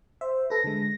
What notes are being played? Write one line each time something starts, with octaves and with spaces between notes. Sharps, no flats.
C5 E5
A4 B4 A#6
D3 G#3